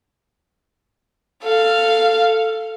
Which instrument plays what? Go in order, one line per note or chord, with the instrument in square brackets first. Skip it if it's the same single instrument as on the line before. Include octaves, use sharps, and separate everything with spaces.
[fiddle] A4 F5